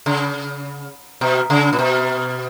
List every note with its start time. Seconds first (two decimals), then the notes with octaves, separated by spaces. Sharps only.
0.06 C#3
1.21 B2
1.50 C#3
1.73 A#2
1.79 B2